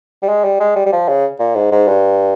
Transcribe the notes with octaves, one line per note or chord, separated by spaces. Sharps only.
G3
G#3
G3
G#3
G3
G3
F3
C#3
A#2
G#2
G#2
G2